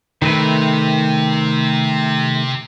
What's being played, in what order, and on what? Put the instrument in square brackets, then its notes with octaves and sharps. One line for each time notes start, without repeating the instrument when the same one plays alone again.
[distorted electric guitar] C3 [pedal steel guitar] D#3 A3 B4